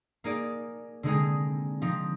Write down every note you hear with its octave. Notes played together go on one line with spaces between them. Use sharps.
A#3 D#4 G#4 D5
D3 G#3 C4 D#4 G#4
F3 C4 D#4